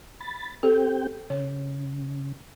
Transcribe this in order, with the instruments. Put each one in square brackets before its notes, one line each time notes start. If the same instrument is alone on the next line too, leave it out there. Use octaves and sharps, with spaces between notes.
[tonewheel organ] B5 A6
[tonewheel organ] C4 G4 G5 [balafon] A4
[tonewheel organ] C#3 [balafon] C#5